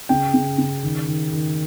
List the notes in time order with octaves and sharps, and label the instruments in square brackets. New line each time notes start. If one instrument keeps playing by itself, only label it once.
[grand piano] C#3 G5
C#3
C#3
D#3
D#3
D#3